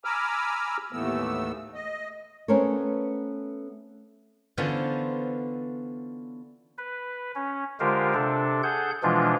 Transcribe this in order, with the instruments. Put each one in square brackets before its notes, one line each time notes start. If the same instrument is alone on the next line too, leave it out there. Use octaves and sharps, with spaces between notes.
[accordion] G#5 A#5 B5 D6 E6 F6
D#2 A2 E3 A3 B3 E6
D#5
[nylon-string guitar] A3 B3 C#4 A#4 C5 C#5
[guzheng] D3 E3 B3 C#4 F4 C5
[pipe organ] B4
C#4
D3 G#3 F4 G4 A#4 C5
C3 D4 A4
G#4 A4 F#5 G6
B2 E3 F3 G#3 D4 F4